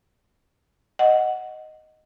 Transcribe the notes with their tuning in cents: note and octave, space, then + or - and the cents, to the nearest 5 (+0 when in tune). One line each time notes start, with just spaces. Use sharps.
D#5 +0 F#5 +0